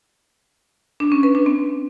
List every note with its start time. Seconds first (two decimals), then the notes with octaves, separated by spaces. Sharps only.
1.00 D4
1.12 C#4
1.23 B4
1.35 D4
1.46 C4